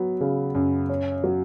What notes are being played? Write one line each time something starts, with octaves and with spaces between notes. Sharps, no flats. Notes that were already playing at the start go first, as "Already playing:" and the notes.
Already playing: F#3 B3
C#3
F#2
C#4
F#3